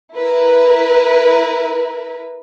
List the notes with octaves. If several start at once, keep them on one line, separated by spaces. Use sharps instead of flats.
E4 A#4 B4